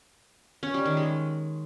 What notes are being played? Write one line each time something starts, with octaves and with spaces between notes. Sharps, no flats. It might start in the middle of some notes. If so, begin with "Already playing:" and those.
C#4
G3
D#3
G#3